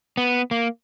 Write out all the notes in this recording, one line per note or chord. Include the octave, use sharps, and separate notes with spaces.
B3
A#3